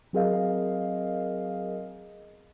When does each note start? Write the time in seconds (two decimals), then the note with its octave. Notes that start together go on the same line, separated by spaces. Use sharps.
0.13 F#3 C4 G#4 A#4 D#5 F5